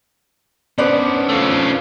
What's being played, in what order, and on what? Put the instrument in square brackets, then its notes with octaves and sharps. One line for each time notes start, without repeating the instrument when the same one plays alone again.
[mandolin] B3 C5 D5 [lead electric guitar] C#4 D4
[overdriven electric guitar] A3 F4